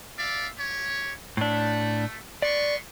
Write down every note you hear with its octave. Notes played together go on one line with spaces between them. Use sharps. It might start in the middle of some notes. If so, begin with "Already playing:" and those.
D5 E5 F5
G4 C#5
A2 A3 D4
B3 D5 C6 C#6